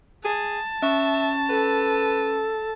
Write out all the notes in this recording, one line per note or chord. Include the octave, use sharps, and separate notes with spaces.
G#4 A5
C#4 E5 C#6
A4 B4